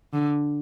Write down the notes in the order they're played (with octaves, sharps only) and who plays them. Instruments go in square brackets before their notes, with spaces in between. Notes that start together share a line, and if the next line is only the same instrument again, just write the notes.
[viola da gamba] D3